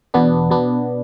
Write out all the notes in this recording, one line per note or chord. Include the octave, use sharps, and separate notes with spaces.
E2 B2 B3 D4
B2 B3 D4